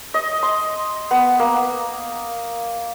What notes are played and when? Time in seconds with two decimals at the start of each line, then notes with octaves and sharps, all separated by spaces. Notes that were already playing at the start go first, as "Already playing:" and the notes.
0.14 D#5
0.43 C6
1.11 B3
1.39 A#3